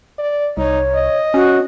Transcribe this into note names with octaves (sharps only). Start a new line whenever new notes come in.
D5
C2 D#4 C#5
D#5
C#4 F#4